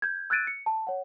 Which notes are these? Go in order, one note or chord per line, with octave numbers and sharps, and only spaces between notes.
G6 G#6
E6 F#6 G#6 A6 D7 D#7
C#7
A5
C#5 F#5